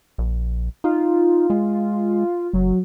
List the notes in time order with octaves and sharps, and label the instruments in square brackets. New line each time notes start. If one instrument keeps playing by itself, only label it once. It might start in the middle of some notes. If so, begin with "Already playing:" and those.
[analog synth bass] A#1
[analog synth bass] D#4 [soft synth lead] F4
[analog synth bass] G#3
[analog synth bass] F#1 [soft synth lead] F#3